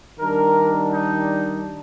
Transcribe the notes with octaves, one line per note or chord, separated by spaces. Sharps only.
D#3 G3 D4 A#4
D#4